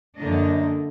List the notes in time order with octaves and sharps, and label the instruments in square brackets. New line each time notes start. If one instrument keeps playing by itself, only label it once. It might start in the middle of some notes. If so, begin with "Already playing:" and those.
[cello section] F#2 D3 A#3 D4 D#5